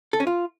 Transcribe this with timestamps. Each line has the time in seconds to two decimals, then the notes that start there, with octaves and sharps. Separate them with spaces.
0.13 A4
0.20 C#4
0.27 F4